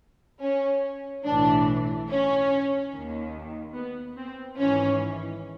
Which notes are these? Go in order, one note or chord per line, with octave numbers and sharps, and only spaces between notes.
C#4
B1 A2 E3 D4
C#4
D#2 D#3
B3
C4
G#1 G#2 E3 C#4